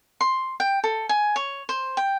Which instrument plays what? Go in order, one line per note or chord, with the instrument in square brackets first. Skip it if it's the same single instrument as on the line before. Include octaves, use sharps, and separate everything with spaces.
[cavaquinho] C6
G5
A4
G#5
C#5
C5
G5